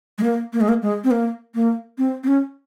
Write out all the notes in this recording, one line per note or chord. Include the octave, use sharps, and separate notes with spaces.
G#3
A#3
A#3
G#3
A#3
G#3
C4
A#3
A#3
C4
C4
C#4